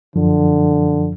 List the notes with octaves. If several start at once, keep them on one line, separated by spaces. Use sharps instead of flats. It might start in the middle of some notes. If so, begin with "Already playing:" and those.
F#2 D3 F3